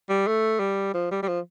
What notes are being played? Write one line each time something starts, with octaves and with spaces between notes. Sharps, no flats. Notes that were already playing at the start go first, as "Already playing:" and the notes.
G3
A3
G3
F3
G3
G3
F3